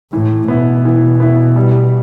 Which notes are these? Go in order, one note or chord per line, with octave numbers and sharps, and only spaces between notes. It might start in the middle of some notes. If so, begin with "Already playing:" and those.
A2 E3
B2 B3 E4
E3
B3 E4
G3